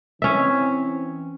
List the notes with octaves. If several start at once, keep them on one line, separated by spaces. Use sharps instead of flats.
E3 C4 C#4 E5